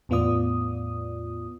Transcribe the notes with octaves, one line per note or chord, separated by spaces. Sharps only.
E2 A2 B3 F4 D5 D#6